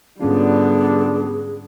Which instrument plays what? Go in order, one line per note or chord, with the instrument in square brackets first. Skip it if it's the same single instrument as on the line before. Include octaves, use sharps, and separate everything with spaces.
[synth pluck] G#2 C#4 F4 [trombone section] D3 D4 [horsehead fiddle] G3 B3 [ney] G#4